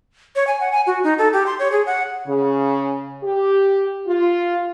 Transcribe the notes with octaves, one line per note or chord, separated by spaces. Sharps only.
C#5
G#5
F#5
G#5
F#4
D#4
A4
G4
C6
C#5
G#4
F#5
C#3
G4
F4